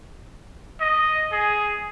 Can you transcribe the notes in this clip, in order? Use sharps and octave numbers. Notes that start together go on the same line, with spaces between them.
D#5
G#4